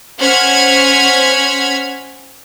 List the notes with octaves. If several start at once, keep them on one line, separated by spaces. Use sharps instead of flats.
C#4 C5 F#5 F6 G#6 B6